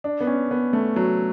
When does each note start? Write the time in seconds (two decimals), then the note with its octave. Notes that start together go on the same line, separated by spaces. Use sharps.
0.04 D4
0.20 B3
0.27 C#4
0.51 B3
0.73 A3
0.96 F#3